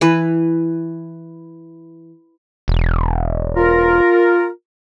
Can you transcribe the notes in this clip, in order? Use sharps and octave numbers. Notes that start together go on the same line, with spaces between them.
E3 B4
E1
F4 A#4